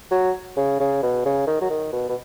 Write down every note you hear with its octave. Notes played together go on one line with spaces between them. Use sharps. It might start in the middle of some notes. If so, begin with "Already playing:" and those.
F#3
C#3
C#3
B2
C#3
D#3
F#3
D#3
B2
B2